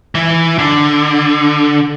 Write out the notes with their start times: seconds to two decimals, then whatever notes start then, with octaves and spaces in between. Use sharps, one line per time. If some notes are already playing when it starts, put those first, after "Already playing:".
0.15 E3
0.59 D3